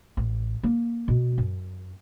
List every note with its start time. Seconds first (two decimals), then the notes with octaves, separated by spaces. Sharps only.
0.17 A1
0.63 A#3
1.08 B2
1.38 F#2